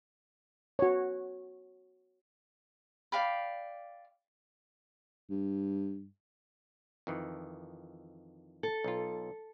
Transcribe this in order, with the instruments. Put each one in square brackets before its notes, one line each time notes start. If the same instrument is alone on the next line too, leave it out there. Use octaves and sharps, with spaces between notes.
[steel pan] F#4 C#5
[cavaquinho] D5 F5 G5 B5
[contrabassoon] G2
[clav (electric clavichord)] F2 D#3 E3
[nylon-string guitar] A4
[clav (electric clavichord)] B1 F4